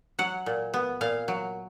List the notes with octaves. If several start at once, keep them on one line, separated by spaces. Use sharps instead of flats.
F#3 F#5
A#2
B3
A#2 F5
F#3